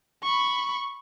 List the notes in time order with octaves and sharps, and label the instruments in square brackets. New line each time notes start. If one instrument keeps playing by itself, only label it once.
[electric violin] B5 C#6